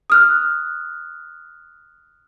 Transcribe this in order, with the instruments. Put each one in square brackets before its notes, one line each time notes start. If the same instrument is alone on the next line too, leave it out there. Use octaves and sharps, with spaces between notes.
[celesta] D#6 F6 F#6